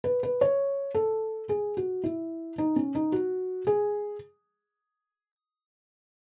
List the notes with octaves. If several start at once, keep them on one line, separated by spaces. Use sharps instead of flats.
B4
B4
C#5
A4
G#4
F#4
E4
D#4
C#4
D#4
F#4
G#4